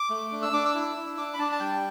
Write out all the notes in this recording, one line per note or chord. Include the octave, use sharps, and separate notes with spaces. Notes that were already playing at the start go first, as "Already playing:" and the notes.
Already playing: D6
A3
D4
E6
D4 D6
E6
E4
E4
D4 D6
B5
D4 A5
A5
G3 G5